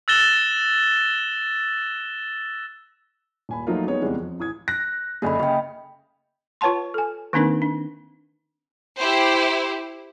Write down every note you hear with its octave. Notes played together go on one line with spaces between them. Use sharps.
E6 F#6 A6 A#6 E7 G7
D#1 G#5 B5
F3 F#3 A3 A#3 D#4 F4
G3 A#3 B3 D#4 G#4 C#5
E2 C3 G3 G#3 B3
F2
A1 D#6 G#6
F#6 A#6
F#1 D3 A#3 G#4 D#5 B5
C#3 D#5 G5
F4 B4 C#5 F#5 A5 C6
A4 G#5
D#3 A#3 C4 D4 D#4 A#4
D4
E4 G4 C5